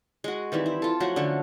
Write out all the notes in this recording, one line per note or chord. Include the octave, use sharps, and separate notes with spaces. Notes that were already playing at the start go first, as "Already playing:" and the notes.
G#3 F#4
D#3 E3 G3 C4
E4
F4 A4
F3 F#3 A3 F#4
D3 A3 C#4